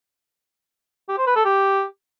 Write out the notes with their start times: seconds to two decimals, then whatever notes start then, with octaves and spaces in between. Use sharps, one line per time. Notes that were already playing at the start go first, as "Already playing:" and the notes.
1.09 G4
1.18 C5
1.27 B4
1.36 A4
1.45 G4